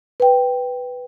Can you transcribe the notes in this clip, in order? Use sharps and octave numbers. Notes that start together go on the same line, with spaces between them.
B4 G5